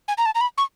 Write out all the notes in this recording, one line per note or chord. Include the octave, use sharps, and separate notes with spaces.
G#5
A#5
A5
A#5
B5
C#6